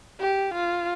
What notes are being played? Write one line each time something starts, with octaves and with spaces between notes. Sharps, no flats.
G4
F4